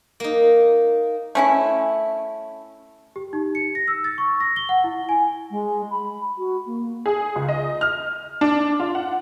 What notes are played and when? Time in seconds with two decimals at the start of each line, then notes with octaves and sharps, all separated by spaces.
0.20 A#3 D#4
1.35 A3 C#4 E4
3.16 G4
3.33 D#4
3.55 C#7
3.75 A#6
3.88 E6
4.04 A6
4.18 C#6
4.40 A#6
4.56 G7
4.69 F#5
4.84 E4
5.09 G#5
5.51 G#3
5.91 B5
6.38 F#4
6.66 A#3
7.06 G#4
7.36 C#2
7.49 D#5
7.81 F6
8.41 D4
8.80 F4
8.95 F#5